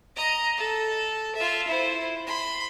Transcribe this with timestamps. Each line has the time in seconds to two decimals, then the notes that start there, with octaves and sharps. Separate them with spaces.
0.16 D#5 A#5
0.57 A4
1.36 F4 E5
1.67 E4 C5
2.27 B5 C6